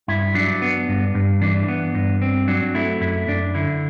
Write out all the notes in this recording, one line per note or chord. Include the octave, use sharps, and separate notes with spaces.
G2 E4
F#3 D4
B3
G2
G2
E3 D4
B3
G2
C4
F#3 D4
A3 E4
F#2 E4
F#2 D4
D3 E4